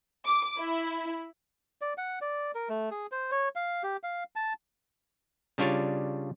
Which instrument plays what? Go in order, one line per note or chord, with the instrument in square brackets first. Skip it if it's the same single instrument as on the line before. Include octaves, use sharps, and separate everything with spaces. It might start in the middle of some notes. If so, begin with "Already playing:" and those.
[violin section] D6
E4
[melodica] D5
F#5
D5
A#4
A3
G#4
C5
C#5
F5
G4
F5
A5
[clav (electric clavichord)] C#3 G3 D4 F4 C#5